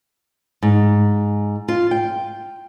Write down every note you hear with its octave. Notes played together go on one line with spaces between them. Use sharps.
G#2
F4
G5